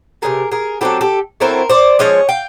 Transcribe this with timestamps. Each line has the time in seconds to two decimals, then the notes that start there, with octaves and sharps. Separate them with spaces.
0.22 C3 E3 A3 G#4 A#4
0.51 G#4 A#4
0.81 F#3 A3 C4 E4 G4 A4
1.01 G4 A4
1.40 F#3 A3 C4 E4 A#4 C5
1.69 C5 D5
1.99 F3 G#3 C#4 C#5 D#5
2.29 F5 G5